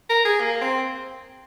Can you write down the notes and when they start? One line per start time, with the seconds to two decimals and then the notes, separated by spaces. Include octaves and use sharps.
0.09 A#4
0.25 G#4
0.41 A#3
0.61 C4